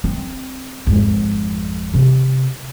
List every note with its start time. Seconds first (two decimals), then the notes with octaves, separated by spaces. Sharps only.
0.04 C4
0.87 G#1 F2
1.94 C3 C4